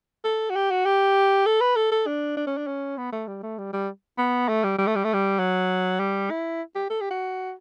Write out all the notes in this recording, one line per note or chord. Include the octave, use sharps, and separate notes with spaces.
A4
F#4
G4
F#4
G4
A4
B4
A4
A4
D4
D4
C#4
D4
C#4
B3
A3
G3
A3
G3
G3
B3
A3
G3
G3
A3
G3
A3
G3
F#3
G3
E4
G4
A4
G4
F#4